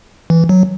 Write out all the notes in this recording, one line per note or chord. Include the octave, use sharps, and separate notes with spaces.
E3
F#3